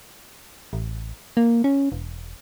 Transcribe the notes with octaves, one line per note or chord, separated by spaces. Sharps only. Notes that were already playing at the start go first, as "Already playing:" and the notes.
A1
A#3
C#4
E1